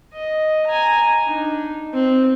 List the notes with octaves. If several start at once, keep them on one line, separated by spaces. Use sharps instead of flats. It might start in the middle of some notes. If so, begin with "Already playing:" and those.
D#5
G#5 A#5
D4 D#4
C4